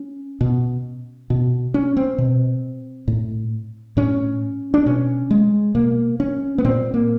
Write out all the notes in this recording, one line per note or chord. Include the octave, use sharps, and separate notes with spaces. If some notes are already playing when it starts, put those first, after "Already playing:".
Already playing: C#4
B2
B2
C#4
C4
B2
A2
A2 C#4
D4
B2 C#4
G#3
B2 A#3
C#4
B3
A#2 C4
A#3